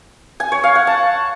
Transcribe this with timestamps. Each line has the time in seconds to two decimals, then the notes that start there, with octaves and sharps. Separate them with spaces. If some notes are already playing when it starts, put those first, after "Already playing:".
0.40 G#5
0.52 C#5
0.64 F5
0.75 F#5
0.87 A5